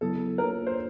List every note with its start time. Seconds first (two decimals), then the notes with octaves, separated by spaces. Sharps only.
0.01 C#3 F#3 B3 E4 A4
0.38 A#3 D4 F4 A4 A#4 C#5
0.67 C5